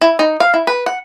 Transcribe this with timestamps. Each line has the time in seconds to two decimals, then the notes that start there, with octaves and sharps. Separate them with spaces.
0.01 E4
0.19 D#4
0.40 F5
0.54 E4
0.67 B4
0.86 F#5